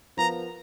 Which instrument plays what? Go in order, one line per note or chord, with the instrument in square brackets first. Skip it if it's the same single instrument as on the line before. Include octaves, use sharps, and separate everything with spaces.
[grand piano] F3 B3 F4 A#4 [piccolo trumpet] A#5